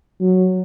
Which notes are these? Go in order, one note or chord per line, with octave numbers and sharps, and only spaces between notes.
F#3